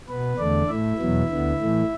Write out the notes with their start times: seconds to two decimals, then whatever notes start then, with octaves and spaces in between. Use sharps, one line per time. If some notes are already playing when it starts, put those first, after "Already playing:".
0.09 B2 B3 B4
0.38 E2 D3 A3 D4 D5
0.68 A2 A3 E4 E5
0.98 E2 B2 F#3 B3
1.29 D2 D3 B3
1.59 A2 E3 A3